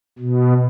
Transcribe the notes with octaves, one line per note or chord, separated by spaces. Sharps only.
B2